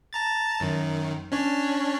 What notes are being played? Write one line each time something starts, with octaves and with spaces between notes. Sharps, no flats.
A5 A#5 A6
F#2 D#3
C#4 D4 C#5